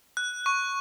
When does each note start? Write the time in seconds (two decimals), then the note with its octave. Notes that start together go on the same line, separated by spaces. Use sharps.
0.17 F#6
0.46 C#6